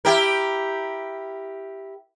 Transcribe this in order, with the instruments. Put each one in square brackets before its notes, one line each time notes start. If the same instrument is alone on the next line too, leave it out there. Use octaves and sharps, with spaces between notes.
[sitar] E4 G4 A#4